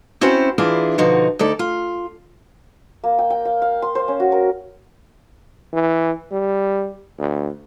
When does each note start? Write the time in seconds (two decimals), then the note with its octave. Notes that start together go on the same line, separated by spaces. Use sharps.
0.21 C4 C#4 E4 F#4 C5
0.58 E3 D4 E4 F4 G#4
0.98 B2 D3 F3 D#4 F#4
1.39 D2 D#4 A4 D5
1.59 F4
3.04 A#3
3.19 G5
3.30 G5
3.45 F5
3.62 F5
3.82 C6
3.95 C5
4.08 C#4
4.20 F#4
4.32 A#4
5.73 E3
6.32 G3
7.19 D2